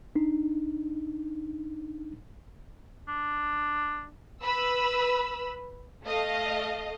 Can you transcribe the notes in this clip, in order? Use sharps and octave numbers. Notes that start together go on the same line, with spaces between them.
D4 D#4
D4
B4 B5 E6
A3 D#5 F5